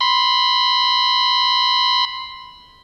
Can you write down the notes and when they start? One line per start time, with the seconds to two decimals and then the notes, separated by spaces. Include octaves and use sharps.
0.01 B5 C6